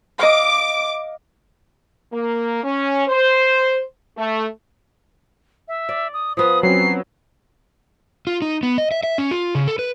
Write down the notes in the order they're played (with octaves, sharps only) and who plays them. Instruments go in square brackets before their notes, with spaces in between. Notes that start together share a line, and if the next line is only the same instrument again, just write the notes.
[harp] D#5 F5 [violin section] D6
[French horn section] A#3
C#4
C5
A3
[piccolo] E5
[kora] D5
[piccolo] D#6
[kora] F3 B3 [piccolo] D#6
[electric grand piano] F#3 C4 C#4 [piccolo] C7
[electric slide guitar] F4
D#4
B3
D#5
E5
E5
C#4
F4
C#3
A4
B4